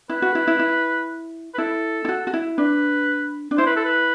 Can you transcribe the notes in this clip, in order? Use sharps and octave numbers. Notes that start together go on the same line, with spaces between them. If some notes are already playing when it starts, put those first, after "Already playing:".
E4 B4
F#4
E4
E4
E4
B4
E4 A4
E4
F#4
F#4
E4
D4 B4
D4
E4 C5
B4
A4
B4